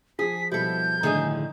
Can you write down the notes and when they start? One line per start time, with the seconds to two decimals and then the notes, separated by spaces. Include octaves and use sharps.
0.19 F3 G#4 B6
0.52 B2 F3 G3 E4 A4 G6
1.03 A2 D3 D#3 D#4 G#4 D#5